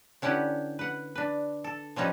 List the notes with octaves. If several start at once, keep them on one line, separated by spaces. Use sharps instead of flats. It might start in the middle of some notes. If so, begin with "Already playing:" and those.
D3 C#4 E4 G4 B4 F#5
B4 F#5
D4 B4
A4
F3 G3 C#4 D#4 B4